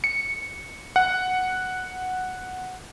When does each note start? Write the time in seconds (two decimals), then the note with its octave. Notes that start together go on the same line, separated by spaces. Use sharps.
0.04 C#7
0.96 F#5